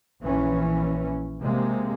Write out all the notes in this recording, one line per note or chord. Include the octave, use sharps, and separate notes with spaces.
A#1 E3 C#4
C3 G#3 A#3